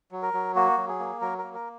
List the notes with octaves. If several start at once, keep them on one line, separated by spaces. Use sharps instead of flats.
F#3
A#4
F#3
A#3 F#4
F#3
G#4
A#3
F#3 A#4
A#4
A#3
A#4